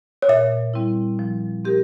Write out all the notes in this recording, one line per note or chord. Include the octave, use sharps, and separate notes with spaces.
C#5
A#2 E5
G3 C4 E4
F3
C4 G4 A#4